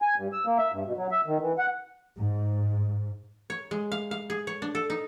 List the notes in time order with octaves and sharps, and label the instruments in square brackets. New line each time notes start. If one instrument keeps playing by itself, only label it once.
[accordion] G#5
G2
E6
A#3
E5
G2
B2
F#3
E5
D#3
E3
F#5
[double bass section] G#2
[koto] C#5
G#3
F5
F5
G#4
C#5
D4
A4
D#4